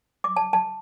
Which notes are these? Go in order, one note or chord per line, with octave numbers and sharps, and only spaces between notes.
D6
A5
A5